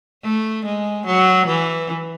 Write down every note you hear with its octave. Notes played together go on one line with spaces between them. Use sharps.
A3
G#3
F#3
E3